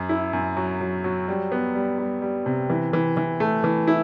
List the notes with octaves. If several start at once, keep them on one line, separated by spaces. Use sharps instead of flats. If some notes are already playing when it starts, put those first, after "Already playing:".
Already playing: F#2
E4
F#2
F#3
F#3
F#3
G3
B3
G3
G3
G3
C3
E3
E3
E3
A3
E3
E4